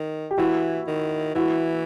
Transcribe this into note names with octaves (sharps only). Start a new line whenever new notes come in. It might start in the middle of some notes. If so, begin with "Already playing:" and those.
Already playing: D#3
G4
E3 E4 F#4
D#3
E3 E4 F#4